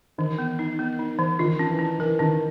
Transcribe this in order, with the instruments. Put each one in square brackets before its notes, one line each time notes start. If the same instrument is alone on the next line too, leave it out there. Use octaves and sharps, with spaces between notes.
[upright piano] D#3 [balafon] E3
[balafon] B3
D#4
B3
D#4
E3
[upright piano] D#3 [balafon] F4
[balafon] C#4
[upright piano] E3
[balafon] C#4
[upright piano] E3 [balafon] A#4
[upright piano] D#3 [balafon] C#4